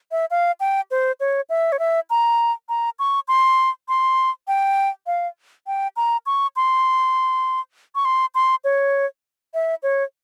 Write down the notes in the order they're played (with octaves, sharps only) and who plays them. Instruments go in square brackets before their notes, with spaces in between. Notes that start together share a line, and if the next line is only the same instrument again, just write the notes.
[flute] E5
F5
G5
C5
C#5
E5
C#5
E5
A#5
A#5
C#6
C6
C6
G5
F5
G5
A#5
C#6
C6
C#6
C6
C6
C#5
E5
C#5